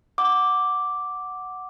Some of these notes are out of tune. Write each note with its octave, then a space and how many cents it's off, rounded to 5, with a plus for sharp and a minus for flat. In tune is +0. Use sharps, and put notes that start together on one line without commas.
F#5 +0 D6 +0